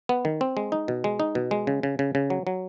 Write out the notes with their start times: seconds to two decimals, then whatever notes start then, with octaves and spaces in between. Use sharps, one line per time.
0.09 B3
0.25 D#3
0.41 C4
0.57 G#3
0.72 D#4
0.88 B2
1.04 G#3
1.20 D#4
1.35 B2
1.51 G#3
1.67 C#3
1.83 C#3
1.99 C#3
2.15 C#3
2.30 F#3
2.47 F#3